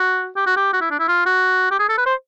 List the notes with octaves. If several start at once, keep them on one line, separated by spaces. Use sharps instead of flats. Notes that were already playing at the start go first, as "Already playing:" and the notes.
Already playing: F#4
G4
F#4
G4
F#4
E4
D4
E4
F4
F#4
G4
G#4
A4
B4
C5